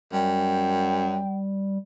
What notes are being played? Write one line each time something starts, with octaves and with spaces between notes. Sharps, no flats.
F#2 G3 G5